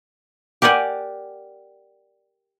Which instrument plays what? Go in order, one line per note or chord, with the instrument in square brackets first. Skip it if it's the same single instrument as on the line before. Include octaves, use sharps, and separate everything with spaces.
[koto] G4 A#4 D5 F#5 G#5